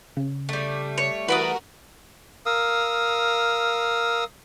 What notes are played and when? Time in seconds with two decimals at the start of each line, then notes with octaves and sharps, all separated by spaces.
0.17 C#3
0.49 G3 A3
0.98 C#5
1.28 E3 F#4 A#4 B4 D5 D#6
2.46 A#4 F5 D#6 E6